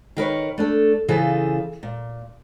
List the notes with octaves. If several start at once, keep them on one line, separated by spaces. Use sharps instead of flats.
D#3 A#4 B4 C#5
A3 D4 A4
C#3 E3 F4 G#4 A4 C5
A#2